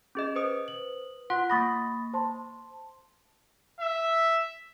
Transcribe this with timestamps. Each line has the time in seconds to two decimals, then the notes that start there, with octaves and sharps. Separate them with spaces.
0.15 C#4 G#4 D#5
0.36 B4 C5 D#6
0.68 F#7
1.30 F4 F#5 C6
1.50 A#3 B5 C#6 D#6 A6 A#6
2.14 C5 A5 C6
3.81 E5